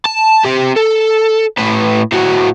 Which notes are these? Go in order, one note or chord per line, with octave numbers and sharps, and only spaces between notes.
A5
C4 G4
A4
A2 B4
A2 F#4